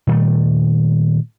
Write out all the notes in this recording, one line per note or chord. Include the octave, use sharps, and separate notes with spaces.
A#2 D#3 G3 A3